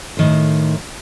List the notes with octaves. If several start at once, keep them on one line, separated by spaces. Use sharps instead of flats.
A2 D#3 C5